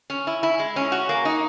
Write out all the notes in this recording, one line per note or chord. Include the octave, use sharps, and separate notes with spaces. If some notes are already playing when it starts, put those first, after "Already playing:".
C#4
E4
E4
G#3
C#4
F#4
A#3
D#4